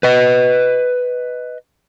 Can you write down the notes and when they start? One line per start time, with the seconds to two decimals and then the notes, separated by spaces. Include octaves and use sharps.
0.03 B4 D#5